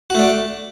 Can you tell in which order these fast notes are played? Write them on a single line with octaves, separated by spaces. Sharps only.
F#4 A3 D4